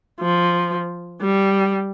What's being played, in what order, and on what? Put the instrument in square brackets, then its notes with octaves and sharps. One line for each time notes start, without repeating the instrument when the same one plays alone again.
[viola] F3
G3